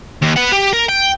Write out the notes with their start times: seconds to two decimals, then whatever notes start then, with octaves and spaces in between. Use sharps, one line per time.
0.23 D#2
0.37 B4 F#5
0.53 G4
0.73 A#4
0.89 G5